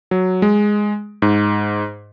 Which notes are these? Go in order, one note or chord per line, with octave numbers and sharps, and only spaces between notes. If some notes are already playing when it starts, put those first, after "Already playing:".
F#3
G#3
G#2